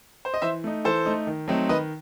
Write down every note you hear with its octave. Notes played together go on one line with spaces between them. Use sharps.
C5
D#5
E3 C5 E5
A3 D#4
E3 A4 C5
A3 D#4
D#3
F#3 A3 C4 D#4
D#3 B4 D#5